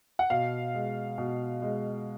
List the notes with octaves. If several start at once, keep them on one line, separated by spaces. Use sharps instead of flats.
F#5
B2 F5
G#3
B2
G#3